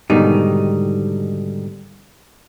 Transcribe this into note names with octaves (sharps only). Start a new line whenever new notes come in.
G#2 B2 D3 D#3 G3 D#4